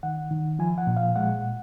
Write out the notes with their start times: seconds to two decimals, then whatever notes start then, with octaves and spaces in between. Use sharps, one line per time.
0.03 D#3 F#5
0.31 D#3
0.59 F3 G#5
0.78 F#5
0.87 A#2
0.97 F5
1.16 G#3 F#5